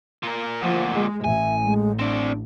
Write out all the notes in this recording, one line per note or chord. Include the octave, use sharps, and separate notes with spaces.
A#2 A#4
D2 A#2 F3 F#5
G#3
A1 E5 G#5
G#3
C4 D4 D5